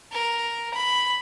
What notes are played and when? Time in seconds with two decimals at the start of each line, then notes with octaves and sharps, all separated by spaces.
0.12 A#4
0.73 B5